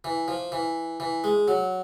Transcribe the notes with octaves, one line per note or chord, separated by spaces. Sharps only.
E3
F3
E3
E3
G#3
F#3